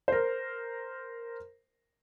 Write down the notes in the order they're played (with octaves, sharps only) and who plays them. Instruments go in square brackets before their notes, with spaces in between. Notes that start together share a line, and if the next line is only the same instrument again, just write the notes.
[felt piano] A#4 C5